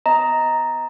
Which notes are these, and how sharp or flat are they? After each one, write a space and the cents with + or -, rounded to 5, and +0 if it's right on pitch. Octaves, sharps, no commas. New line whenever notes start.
B3 +35 D#5 +15 A#5 +0